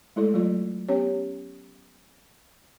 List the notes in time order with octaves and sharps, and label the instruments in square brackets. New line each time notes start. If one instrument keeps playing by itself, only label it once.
[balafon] G#3 A3 E4 A4 D5
F#3 A3 F4 D5
B3 C#4 G4 C#5